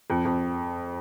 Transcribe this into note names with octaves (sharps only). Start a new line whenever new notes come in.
F2
F2